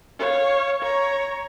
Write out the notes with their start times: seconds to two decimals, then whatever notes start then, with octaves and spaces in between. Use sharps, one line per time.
0.19 C#5 F5
0.82 C#5 A#5